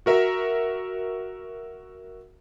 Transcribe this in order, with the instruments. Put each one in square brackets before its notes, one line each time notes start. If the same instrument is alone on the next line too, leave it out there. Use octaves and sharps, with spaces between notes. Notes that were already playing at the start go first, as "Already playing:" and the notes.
[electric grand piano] F#4 A#4 E5